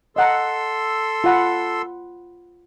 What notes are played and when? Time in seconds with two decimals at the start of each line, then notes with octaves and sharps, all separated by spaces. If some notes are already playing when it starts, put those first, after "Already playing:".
0.16 A4 D#5 F#5 A#5 C6 E6
1.24 F4 F#5 B5